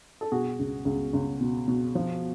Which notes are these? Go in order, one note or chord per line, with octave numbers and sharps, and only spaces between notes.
A4
B2 F#4 G#4
C#2
C#2
C#2
B2
B2
F3